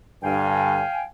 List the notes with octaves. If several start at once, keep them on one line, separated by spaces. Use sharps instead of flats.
G2 D3 F5 G5 G#5